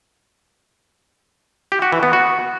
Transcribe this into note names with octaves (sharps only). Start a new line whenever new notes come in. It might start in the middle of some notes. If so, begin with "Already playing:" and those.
G4
F#4
E3
B3
F#4